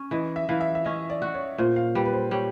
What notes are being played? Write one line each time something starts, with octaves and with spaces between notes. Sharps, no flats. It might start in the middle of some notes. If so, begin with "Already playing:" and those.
Already playing: C#4
E3 D#5
E5
E3 F5
E5
E5
C#4 D#5
D5
F#4
C#5
A#2 C5
F5
G3 B4
B4
C5
G3 C#5